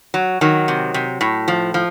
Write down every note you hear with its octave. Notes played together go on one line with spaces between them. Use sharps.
F#3
D#3 F#3
C3
C3
A2
F3
F3